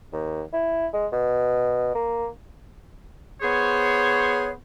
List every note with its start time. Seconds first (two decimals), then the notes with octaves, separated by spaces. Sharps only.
0.13 D#2
0.53 E4
0.93 G#3
1.12 B2
1.95 A#3
3.42 B3 G#4 C5 C#5